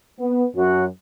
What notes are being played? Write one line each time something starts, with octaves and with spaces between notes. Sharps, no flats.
B3
F#2 F#4